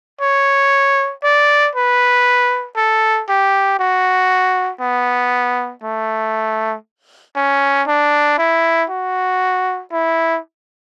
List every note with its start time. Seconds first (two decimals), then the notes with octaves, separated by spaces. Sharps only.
0.21 C#5
1.24 D5
1.75 B4
2.76 A4
3.29 G4
3.79 F#4
4.81 B3
5.84 A3
7.36 C#4
7.87 D4
8.38 E4
8.90 F#4
9.92 E4